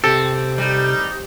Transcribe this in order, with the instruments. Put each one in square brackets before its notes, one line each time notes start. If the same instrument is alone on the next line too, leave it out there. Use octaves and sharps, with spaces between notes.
[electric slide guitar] C3 G4 [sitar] C4 [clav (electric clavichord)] A4
[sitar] G3 [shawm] D#4